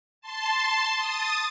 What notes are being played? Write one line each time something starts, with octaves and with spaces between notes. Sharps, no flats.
A5 C6
D#6 A6